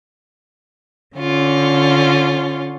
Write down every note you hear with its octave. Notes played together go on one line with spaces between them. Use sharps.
D3 C#4 F4